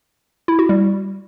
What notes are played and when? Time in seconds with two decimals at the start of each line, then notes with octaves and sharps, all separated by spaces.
0.48 E4
0.59 F#4
0.69 G3